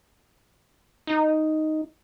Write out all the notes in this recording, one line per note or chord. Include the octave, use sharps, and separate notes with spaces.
D#4